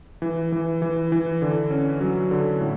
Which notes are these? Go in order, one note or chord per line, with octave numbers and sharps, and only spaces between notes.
E3
E3
E3
E3
D3
C#4
F#3
D3
A2